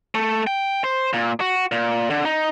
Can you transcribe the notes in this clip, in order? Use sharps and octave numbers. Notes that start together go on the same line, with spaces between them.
A3
G5
C5
A#2
F#4
A#2
D3
D#4